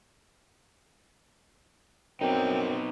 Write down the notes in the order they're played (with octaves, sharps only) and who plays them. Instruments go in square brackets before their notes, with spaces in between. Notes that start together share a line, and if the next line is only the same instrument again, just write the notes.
[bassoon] F#2 [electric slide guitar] B3 D#4 [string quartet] C4 [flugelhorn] G5